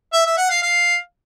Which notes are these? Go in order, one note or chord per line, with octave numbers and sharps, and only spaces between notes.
E5
E5
F#5
F5
F5